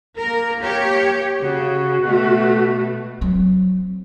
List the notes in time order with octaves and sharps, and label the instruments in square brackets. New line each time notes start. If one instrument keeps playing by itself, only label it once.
[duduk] A#3 [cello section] A#4
[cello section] G4 C#5
[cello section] C#3 [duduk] F#4
[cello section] B2 A3
[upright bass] F#3 C4